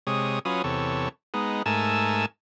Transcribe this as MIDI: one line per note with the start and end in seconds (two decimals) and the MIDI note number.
0.07 0.39 48
0.07 0.39 56
0.07 0.39 73
0.07 0.39 87
0.45 0.62 54
0.45 0.62 61
0.45 0.62 65
0.45 0.62 71
0.45 0.62 87
0.64 1.09 40
0.64 1.09 48
0.64 1.09 69
0.64 1.09 73
1.34 1.63 56
1.34 1.63 59
1.34 1.63 63
1.66 2.26 44
1.66 2.26 57
1.66 2.26 70
1.66 2.26 80
1.66 2.26 81
1.66 2.26 88